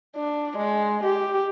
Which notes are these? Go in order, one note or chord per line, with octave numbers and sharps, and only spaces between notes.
D4
G#3
G4